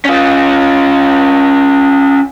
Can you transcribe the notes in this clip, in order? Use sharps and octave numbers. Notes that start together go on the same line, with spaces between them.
C#4 F4